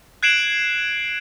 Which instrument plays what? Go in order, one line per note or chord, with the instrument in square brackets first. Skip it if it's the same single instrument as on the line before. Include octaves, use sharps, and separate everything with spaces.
[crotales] F#6 G#6 C7 D7 E7 F#7